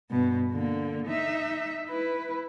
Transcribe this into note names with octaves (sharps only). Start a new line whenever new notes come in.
G2 B2
D3 A#3
D#4 E5
E4 B4